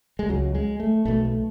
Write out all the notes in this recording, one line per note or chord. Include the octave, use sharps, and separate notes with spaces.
G#3
C#2 C#3 F#3
G#3
A3
B1 B2 A3
A3